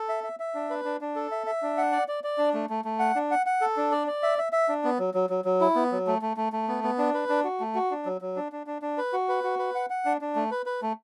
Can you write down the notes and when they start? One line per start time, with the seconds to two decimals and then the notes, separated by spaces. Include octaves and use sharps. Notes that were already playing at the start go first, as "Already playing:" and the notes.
Already playing: A4
0.09 E5
0.24 E5
0.40 E5
0.55 D4
0.70 B4
0.85 D4
1.01 D4
1.16 A4
1.32 E5
1.47 E5
1.62 D4
1.78 F#5
1.92 D5
2.08 D5
2.24 D5
2.38 D4
2.54 A3
2.70 A3
2.85 A3
2.99 F#5
3.15 D4
3.31 F#5
3.46 F#5
3.61 A4
3.77 D4
3.92 D5
4.07 D5
4.23 E5
4.38 E5
4.53 E5
4.69 D4
4.84 B3
4.99 F#3
5.14 F#3
5.30 F#3
5.45 F#3
5.61 E4
5.75 B3
5.92 F#3
6.07 A3
6.22 A3
6.37 A3
6.53 A3
6.68 B3
6.84 B3
6.98 D4
7.14 B4
7.29 D4
7.44 F#4
7.60 A3
7.75 F#4
7.91 D4
8.05 F#3
8.21 F#3
8.36 D4
8.52 D4
8.67 D4
8.82 D4
8.98 B4
9.13 F#4
9.29 B4
9.44 F#4
9.59 B4
9.75 F#5
9.90 F#5
10.05 D4
10.21 D4
10.36 A3
10.51 B4
10.66 B4
10.82 A3